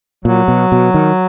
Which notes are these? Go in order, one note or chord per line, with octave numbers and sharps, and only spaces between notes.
A#2 F#3
B2
B2
D#3